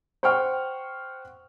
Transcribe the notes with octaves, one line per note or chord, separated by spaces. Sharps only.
C5 F#5 G5 C#6 F6